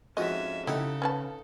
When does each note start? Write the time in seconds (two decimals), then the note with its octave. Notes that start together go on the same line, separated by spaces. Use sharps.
0.17 F2 G#2 C#4 F#4 D#5 E5
0.67 C#3 D#4 E4 G4 A4 F#5 B5
1.02 C#4 B4 A5